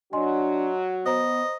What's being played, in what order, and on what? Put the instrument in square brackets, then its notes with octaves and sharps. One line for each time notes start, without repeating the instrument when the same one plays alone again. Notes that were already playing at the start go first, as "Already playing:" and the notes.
[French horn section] F#3 F#4 [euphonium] D4 [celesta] D#5 G#5 C6
[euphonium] B3 [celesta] C5 A#5 [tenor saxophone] D#5